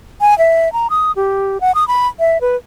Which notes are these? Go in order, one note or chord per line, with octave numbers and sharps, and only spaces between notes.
G#5
E5
A#5
D#6
G4
F#5
D#6
B5
E5
B4